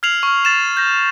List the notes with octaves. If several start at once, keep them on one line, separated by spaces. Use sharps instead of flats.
F6 G#6 C7 F7 F#7
C#6 F6
A6 E7
G6 A#6